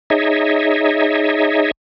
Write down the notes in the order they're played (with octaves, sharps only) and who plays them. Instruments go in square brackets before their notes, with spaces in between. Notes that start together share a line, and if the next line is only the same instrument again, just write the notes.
[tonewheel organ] D#4 G#4 C#5 D#5 E5